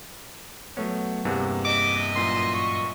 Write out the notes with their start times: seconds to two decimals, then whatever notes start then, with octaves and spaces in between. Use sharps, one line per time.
0.77 F#3 A3 B3 C#5
1.25 E2 G2 C3 A#3 F#5
1.65 D#5 E5 D6
2.16 F#2 A#2 E3 C6
2.54 C#6